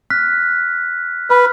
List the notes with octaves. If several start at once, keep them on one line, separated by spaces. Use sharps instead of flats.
F6 F#6 B6
B4 F6